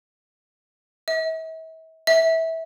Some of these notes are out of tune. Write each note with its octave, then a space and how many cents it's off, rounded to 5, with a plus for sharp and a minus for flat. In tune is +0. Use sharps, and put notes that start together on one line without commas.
E5 -40
E5 -20